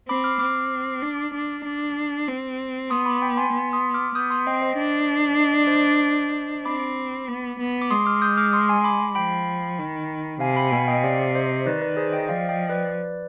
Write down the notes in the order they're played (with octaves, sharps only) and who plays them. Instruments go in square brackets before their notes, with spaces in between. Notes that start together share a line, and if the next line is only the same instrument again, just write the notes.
[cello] C4 [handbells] B5 D6
[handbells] D6 F6
[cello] C4 [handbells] D6 F6
[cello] D4
D4
D4
C4
[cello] B3 [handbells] C6 D#6
[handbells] B5 D6
G5 B5
G#5 C6
[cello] B3
[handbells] C6 D#6
D6 F6
[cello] B3 [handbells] D#6 G6
[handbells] C6 D#6
[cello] C4 [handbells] D#5 G5
[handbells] C5 D#5
[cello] D4
[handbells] D#5
D5
C5 D#5
[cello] C4 [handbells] B5 D6
[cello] B3
B3
[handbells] D6
[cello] G#3 [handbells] C6 D#6
[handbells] D6 F6
D#6 G6
D6 F6
C6 D#6
G#5 C6
B5 D6
[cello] F3 [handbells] G5 B5
[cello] D#3
[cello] C3 [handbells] F5 G#5
[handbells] G5 B5
[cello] B2 [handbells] F5 G#5
[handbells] D#5 G5
[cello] C3 [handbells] D5 F5
[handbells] C5 D#5
[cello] D#3 [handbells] B4 D5
[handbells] B4 D5
G#4 C5
D#5 G5
[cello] F3 [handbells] D5 F5
[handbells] D#5 G5
B4 D5